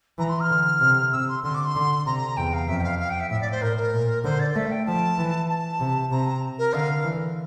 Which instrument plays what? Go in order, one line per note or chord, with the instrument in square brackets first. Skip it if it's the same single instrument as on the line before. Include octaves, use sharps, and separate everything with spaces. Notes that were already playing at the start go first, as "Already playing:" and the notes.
[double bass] E3 [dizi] A#5
[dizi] C6
F6
[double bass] D3
C3
[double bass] C3 [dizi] E6
[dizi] C6
[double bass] D3 [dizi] C6
[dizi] D6
C6
[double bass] D3
[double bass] C3 [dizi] A#5
[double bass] E2 [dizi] G5
[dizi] F5
[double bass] F2 [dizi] E5
[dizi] G5
F5
F5
G5
E5
[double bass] A2 [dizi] E5
[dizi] D5
C5
[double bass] A2 [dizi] A#4
[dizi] A#4
[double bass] A#2
[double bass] D3 [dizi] C5
[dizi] D5
[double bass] A3 [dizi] E5
[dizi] F5
G5
[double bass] F3 [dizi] A5
[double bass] E3
[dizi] A5
[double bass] C3
[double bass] C3 [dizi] A#5
[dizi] A#4
[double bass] D3 [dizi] F5
[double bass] E3